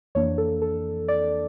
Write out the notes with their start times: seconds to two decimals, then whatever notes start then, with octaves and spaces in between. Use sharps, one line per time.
0.15 F2 E3 A#3 D4 C#5
0.38 A4
0.62 A4
1.08 D5